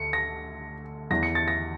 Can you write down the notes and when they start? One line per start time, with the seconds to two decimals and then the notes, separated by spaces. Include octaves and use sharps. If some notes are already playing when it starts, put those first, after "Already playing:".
Already playing: D2 C#7
0.13 A#6
1.10 E2 E3 A#6
1.23 C#7
1.35 A6
1.48 A#6